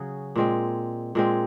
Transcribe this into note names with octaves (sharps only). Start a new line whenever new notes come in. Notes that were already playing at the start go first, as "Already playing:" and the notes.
Already playing: C#3 F#3 C#4 G#4
A#2 G#3 C4
A#2 G#3 C4